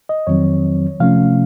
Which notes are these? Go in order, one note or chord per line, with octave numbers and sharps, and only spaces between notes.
D#5
F2 D#3 F#3 C4 C#5
C3 F3 A3 C#4 F5